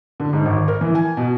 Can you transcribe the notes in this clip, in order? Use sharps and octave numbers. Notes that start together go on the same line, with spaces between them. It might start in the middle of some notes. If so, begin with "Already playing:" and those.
D3
G#2
G#1
A#4
E3
G#5
B2